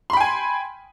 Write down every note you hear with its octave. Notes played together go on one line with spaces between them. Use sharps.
G5 G#5 B5 C6